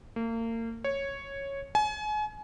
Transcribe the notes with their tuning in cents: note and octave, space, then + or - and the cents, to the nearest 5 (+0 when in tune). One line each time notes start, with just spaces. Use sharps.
A#3 -35
C#5 -5
G#5 +35